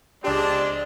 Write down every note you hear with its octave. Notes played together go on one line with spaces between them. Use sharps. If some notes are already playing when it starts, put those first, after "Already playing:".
C#2 G#3 C4 D4 G4 D5